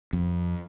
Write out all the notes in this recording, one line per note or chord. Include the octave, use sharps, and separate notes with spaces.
F2